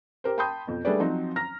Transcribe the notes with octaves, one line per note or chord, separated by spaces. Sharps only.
G4 A#4 C5
G5 A5 B5 C6 D#6 G6
F2 B2
G3 A3 D4 G#4 B4 D5
F3 F#3 C4 D#4
A#5 F6 A#6